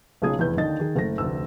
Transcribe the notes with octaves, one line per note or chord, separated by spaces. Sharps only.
B1 A#2 C#3 G#4 D#6 G#6
F1 E2 B4 G6
D#2 D3 D#3 D#5 A6
D#3 G#4
F#1 A3 A#6
F1 D2 E6